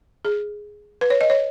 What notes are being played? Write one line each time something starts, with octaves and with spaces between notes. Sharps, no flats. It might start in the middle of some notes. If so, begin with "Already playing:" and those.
G#4
B4
C#5
D#5
C#5